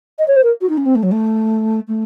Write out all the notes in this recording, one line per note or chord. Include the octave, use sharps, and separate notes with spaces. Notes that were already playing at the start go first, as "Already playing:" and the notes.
D#5
C#5
C5
A#4
F#4
D#4
C#4
C4
A3
F#3
A3
A3